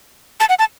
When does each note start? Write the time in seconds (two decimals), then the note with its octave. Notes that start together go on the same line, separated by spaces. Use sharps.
0.40 A5
0.49 F#5
0.59 A5